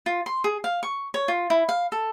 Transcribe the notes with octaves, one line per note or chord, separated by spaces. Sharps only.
F4
C6
G#4
F5
C#6
C#5
F4
E4
F5
A4